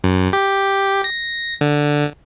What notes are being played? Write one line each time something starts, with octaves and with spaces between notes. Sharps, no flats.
F#2
G4
A#6
D3